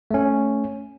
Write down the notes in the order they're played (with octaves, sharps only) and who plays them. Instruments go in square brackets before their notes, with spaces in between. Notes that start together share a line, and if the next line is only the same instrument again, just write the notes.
[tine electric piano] A3 C#4